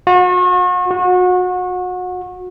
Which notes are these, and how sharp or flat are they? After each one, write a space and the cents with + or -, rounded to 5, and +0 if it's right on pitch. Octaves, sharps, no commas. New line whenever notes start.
F#4 -40
F#4 -30